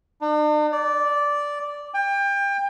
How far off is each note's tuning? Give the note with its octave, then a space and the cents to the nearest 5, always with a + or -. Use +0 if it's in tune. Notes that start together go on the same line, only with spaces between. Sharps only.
D4 +45
D5 -10
G5 +30